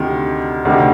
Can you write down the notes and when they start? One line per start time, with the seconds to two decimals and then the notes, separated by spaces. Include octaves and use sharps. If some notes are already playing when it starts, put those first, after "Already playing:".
Already playing: D2 C3 D#3
0.65 D2 C3 D#3